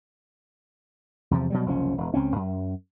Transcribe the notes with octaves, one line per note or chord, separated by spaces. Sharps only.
E2 C3 F3
B2 F#3 G3
F#1 C2 F3 C#4
E1
C#2 C4 C#4
F#2